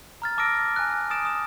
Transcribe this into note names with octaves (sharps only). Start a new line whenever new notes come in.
A#5 F6 A6
A5 D6 E6 F6 A#6 D7
G#5 F#6
D#6 A6 D7 E7
D#6 E7